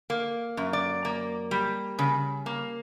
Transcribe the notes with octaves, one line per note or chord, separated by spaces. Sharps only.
A#3
F#2
D5
A#3
G3
C#3
A#3